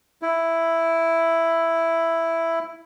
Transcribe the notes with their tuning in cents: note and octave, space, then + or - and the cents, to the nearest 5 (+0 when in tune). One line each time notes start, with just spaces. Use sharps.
E4 +5